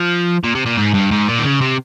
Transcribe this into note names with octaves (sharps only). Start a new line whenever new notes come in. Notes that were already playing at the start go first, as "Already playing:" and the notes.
Already playing: F3
A#2
C3
A#2
G#2
G2
G#2
A#2
D#3
C#3
C3